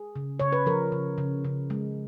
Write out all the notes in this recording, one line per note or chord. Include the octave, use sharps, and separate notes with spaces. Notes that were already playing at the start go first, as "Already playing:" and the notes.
Already playing: G#4
C#3
C#3 C#5
B4
F3 A#4
C#3
C#3
C#3
G#3